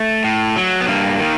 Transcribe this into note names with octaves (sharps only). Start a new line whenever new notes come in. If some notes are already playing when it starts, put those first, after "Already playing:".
Already playing: A3
A2
F#3
B3
G2 A#3
D#3